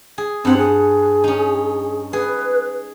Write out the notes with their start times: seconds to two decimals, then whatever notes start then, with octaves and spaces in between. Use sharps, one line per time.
0.18 G#4
0.45 G2 C4 F#5
0.58 G#4
1.24 C#4 D#4
2.13 G#4 B4